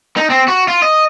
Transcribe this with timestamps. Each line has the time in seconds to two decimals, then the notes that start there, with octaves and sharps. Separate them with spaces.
0.17 D#4
0.30 C4
0.48 F#4
0.68 F4
0.82 D#5